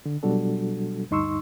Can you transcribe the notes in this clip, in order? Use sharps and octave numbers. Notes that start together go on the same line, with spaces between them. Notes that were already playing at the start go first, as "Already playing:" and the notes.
D3
B2 F#3 G3 D4 F#4 A4
D2 G2 D#4 C6 C#6 E6